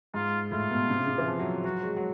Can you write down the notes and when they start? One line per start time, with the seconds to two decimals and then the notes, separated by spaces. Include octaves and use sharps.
0.14 G#2 F4
0.51 A2 F4
0.71 B2
0.90 C3
0.99 C#3
1.08 C3
1.18 E3
1.27 F3
1.39 F#3
1.64 F#3 F#4
1.83 G#3
1.97 F#3